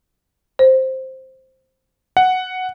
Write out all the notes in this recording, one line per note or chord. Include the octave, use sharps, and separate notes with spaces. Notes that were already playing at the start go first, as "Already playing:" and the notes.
C5
F#5